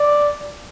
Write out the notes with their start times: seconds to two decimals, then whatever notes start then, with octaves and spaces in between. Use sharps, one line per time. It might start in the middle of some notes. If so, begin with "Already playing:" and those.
Already playing: D5